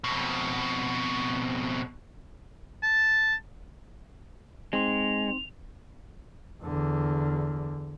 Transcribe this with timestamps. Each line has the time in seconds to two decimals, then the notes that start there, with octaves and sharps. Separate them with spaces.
0.04 F2 B2
2.83 A5
4.73 G#3 C4 D#4 C6 F7
6.62 E2 D3